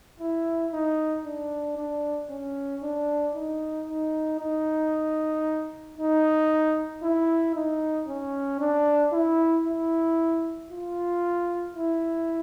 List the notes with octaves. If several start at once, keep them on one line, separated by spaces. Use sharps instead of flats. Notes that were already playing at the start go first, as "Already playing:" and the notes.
E4
D#4
D4
D4
C#4
D4
D#4
D#4
D#4
D#4
E4
D#4
C#4
D4
E4
E4
F4
E4